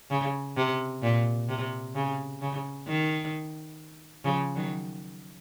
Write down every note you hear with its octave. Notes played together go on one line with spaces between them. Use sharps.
C#3
C3
A#2
C3
C#3
C#3
D#3
C#3 F3
D#3 F#3